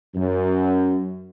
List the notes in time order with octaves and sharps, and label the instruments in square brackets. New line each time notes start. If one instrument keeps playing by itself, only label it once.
[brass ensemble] F#2